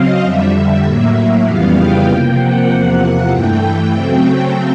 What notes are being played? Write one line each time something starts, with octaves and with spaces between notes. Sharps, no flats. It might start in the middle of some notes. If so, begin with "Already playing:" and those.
Already playing: C#3 F#3 C4 D#5 F5
F2 D3 G3 E5
A2 F#3 A#3
F2 C#3 E3 G3 B3 F5
G5
C3 F3 A#3 G5
F#5
E2 C3 F3 A#3 F#5
F#5
G2 E3 A3 G5
C#3 F#3 A3 C4